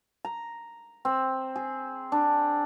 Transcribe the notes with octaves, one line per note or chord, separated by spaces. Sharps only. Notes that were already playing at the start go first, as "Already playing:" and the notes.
A#5
C4
G#4
D4